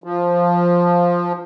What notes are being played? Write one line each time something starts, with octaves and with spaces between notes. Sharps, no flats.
F3